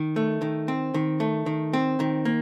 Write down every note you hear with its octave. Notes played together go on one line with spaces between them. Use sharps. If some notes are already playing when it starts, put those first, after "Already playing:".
Already playing: D#3
A3
D#3
C4
D#3
A3
D#3
C4
D#3
A#3